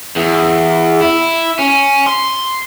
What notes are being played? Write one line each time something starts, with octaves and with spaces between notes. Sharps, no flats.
E2
E4
C#4
C6